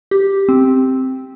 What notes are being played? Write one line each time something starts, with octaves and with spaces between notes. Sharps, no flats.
G4
C4